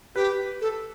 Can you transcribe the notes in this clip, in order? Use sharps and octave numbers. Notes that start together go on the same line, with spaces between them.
G4 B4
A4